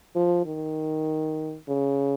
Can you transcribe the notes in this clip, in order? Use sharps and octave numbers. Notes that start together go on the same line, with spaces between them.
F3
D#3
C#3